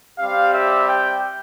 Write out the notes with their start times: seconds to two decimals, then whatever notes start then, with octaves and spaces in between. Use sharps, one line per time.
0.18 G3 C4 G4 F5
0.53 E5
0.88 G5